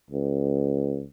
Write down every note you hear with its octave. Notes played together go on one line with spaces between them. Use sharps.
C#2